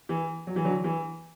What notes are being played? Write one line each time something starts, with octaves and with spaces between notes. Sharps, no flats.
E3
F#3
E3
D3 F#3
E3